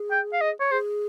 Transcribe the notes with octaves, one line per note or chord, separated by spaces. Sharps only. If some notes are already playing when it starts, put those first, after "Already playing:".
Already playing: G#4
G5
F5
D#5
C#5
G#4 C5